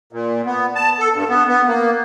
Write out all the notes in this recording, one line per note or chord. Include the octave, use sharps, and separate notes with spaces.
A#2
B3
A5
A4
G2
B3
B3
A#3